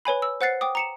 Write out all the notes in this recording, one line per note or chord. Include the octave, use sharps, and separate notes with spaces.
B4 C#5 G#5 B5
E6
C5 F#5 F#6 A6 C7
G5 D6 D#6
A#5 C#7 E7